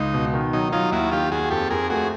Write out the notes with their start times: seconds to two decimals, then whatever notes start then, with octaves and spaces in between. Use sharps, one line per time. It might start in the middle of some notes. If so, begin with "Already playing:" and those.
Already playing: C#2 D#4
0.14 B2
0.34 D#3
0.53 F#3 D#4
0.72 F#3 D#4 F4
0.92 D#2 E4 F#4
1.11 D#3 F4 G4
1.31 D#2 F#4 G#4
1.50 F2 G4 A4
1.70 F2 G#4 A#4
1.90 A3 F#4 G#4